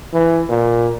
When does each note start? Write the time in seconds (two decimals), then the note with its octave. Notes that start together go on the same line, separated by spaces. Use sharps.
0.13 E3
0.49 A#2